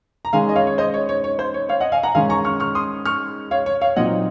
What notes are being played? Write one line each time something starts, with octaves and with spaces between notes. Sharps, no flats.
A#5
D#3 G#3 C#4 F5 G#5
D#5
C#5 F5
C#5
C5 D#5
C#5
C#5
C#5
C5
C#5
C#5 F5
D#5 F#5
F5 G#5
F#5 A#5
G#2 D#3 G#3 C#4 F5 G#5
A#5 C#6
C#6 F6
C#6 F6
C6 D#6
C#6 F6
C#5 F5
C#5
C#5 F5
A#2 F#3 C4 D#4 D#5 F#5